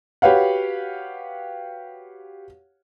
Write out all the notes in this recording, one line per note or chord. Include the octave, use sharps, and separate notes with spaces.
F#4 G4 B4 C#5 F5 F#5